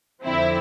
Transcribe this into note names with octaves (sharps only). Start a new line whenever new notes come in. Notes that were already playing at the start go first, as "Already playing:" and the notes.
F2 D3 F3 C4 E4